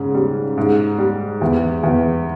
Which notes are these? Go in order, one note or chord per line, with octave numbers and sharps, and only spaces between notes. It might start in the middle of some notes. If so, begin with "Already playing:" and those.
Already playing: G#2 C#3
G3
G#2
G3
E2
E2